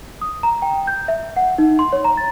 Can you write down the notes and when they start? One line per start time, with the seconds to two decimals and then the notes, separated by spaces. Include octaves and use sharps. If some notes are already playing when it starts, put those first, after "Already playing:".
0.21 D#6
0.43 A#5
0.62 G5
0.87 G6
1.08 E5
1.36 F#5
1.58 D#4
1.79 C6
1.93 C#5
2.05 A#5
2.17 A6